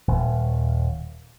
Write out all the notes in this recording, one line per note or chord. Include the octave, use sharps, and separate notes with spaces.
D#1